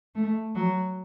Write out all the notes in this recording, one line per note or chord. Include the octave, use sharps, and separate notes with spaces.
A3
F#3